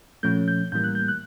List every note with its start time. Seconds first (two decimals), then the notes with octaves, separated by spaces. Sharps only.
0.23 A#2 F3 A3 C#4 G6
0.48 G6
0.72 A2 E3 G3 A#3 G6
0.84 F#6
0.95 G6
1.08 F#6